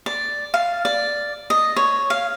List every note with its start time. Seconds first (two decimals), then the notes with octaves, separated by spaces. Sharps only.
0.06 D5
0.54 F5
0.85 D5
1.50 D#5
1.76 C#5
2.10 F5